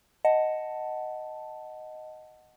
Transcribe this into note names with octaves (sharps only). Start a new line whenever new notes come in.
D#5 F#5 A5